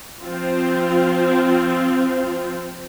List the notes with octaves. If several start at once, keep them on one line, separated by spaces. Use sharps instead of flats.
F3 C4 F4